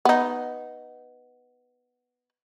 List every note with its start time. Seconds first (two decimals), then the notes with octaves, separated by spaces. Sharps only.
0.05 B3 D#4